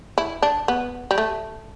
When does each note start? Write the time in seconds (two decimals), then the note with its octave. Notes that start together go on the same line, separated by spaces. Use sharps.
0.18 E4
0.42 D4
0.68 B3
1.11 G3
1.18 A3